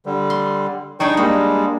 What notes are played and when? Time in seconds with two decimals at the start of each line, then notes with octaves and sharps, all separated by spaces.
0.06 D3 G3
0.30 C6
1.00 G3 D4 D#4 G#4 G5 C#6
1.17 G3 G#3 A#3